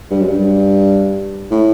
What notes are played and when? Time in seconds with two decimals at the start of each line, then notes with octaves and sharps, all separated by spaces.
0.11 G2
0.22 F#2
0.28 G2
1.51 A2